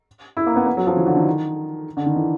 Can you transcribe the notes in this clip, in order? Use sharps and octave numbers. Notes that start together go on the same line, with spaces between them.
E4
A#3
B3
B3
F#3
F3
E3
D3
D#3
D3
D#3
E3